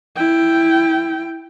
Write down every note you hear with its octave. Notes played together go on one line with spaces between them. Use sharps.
E4 G5